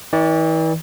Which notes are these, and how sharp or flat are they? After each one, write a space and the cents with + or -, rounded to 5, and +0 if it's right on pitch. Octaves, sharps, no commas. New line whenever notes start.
E3 -40 D5 +0